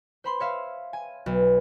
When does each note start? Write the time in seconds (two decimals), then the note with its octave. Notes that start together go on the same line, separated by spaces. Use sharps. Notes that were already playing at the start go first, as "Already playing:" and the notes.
0.24 C5 B5 C6
0.40 C#5 E5 F5
0.93 G#5
1.26 B1